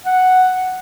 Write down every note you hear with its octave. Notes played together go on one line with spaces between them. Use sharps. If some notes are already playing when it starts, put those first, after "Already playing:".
F#5